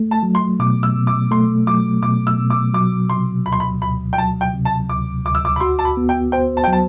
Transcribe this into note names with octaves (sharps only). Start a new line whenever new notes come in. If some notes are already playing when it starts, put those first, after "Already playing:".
Already playing: A3
A5
F#3
C6
B2 D6
E6
B2
D6
A3 C6
F#3 D6
B2 D6
E6
B2
D6
F#3 D6
C3 C6
D2 B5
C6
B5
D2 B5
G5
F#3 A5
G5
C3
A5
D2 D6
D2 D6
E6
D6
B5
F#4 C6
A5
B5
B3
G5
C5 G5
A5
G5
F#3 A5